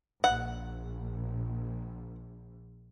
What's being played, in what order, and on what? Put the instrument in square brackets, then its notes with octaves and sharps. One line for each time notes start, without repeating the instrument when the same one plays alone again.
[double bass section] A#1 [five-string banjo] F#5